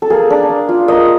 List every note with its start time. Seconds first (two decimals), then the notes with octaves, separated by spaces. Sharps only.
0.02 A4
0.10 A#3 G#4
0.30 D4
0.50 A#3
0.69 F4
0.88 A#3 D#5